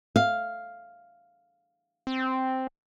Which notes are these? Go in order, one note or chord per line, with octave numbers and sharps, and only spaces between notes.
F5
C4